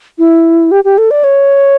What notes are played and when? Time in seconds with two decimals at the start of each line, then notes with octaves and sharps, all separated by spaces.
0.19 E4
0.71 G4
0.84 G4
0.98 A4
1.11 D5
1.24 C#5